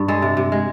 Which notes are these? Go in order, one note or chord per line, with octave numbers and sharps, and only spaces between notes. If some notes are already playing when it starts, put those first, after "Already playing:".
Already playing: G2
G#3 A4
C3
C3
G#3